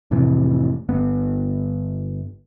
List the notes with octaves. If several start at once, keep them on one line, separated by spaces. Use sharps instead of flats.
F1 A2 C3 E3
G1 B3